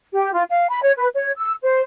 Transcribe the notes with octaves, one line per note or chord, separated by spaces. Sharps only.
G4
F4
F5
B5
C#5
B4
C#5
E6
C5